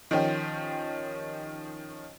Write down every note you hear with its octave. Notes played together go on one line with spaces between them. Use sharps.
D#3 F3 C#4 G4